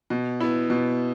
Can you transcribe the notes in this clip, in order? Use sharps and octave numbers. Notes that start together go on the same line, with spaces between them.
B2
B3 E4
B2